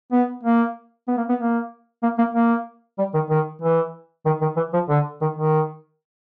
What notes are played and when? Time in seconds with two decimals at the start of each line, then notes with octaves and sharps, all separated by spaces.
0.12 B3
0.43 A#3
1.08 B3
1.17 A#3
1.29 B3
1.39 A#3
2.03 A#3
2.18 A#3
2.35 A#3
2.99 G3
3.14 D#3
3.30 D#3
3.62 E3
4.26 D#3
4.41 D#3
4.57 E3
4.73 F3
4.89 D3
5.21 D#3
5.36 D#3